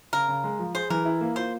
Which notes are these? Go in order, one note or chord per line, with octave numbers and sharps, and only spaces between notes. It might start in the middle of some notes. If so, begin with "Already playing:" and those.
C#3 A#4
C#3
G#3
F3
G#4 C5
E3 A#4
E4
A#3
F4 C5